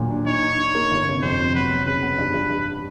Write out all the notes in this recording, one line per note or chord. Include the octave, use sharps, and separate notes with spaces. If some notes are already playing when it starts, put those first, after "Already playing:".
Already playing: D#2 A#2 F#3 D4
D4
D#4 C#5
D#4
D#4
A#3
G1
C3
F2 C5
C3
F#3 B4
B3
C#3 B4
B3
G2
G2
G2